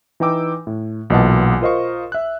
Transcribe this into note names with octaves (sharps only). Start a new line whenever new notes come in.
E3 D#4 B4 G5 D6 E6
A2
B1 A#2 E3 D#5 F#5 A5
F4 A#4 C5 D#5 F5 C#6
E5 F#6